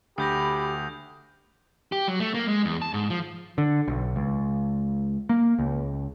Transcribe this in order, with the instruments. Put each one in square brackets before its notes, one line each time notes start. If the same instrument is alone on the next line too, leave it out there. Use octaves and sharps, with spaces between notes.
[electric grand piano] D2 [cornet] G4 [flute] B5 [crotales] D#6 G6 A#6
[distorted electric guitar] G4
F#3
A3
A#3
G#3
E2
A5
G#2
F3
[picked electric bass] D3
B1
C#2
A#3
C#2